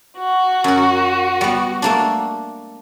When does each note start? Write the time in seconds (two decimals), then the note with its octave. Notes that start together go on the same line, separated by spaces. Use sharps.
0.19 F#4
0.64 F#2 A#4
1.41 G3 B3
1.82 A3 A#3 D4